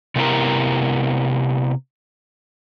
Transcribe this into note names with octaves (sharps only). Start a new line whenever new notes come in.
C3 A3 B3 E4 G4 A#4